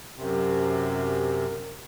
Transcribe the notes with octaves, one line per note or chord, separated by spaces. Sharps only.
F#2 C3